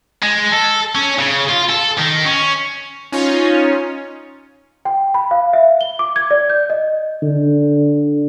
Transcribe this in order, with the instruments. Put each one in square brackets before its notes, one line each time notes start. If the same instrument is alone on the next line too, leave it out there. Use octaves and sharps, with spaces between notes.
[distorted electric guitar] G#3
A4
C#4
C#3
F4
A4
D#3
C#4
[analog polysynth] C#4 D#4 F4 C#5
[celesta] G5
B5
F5
E5
G7
D6
G#6
D5
G6
D#5
[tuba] D3